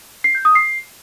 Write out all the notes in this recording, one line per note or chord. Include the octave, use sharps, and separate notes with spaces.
C7
G6
D#6
C7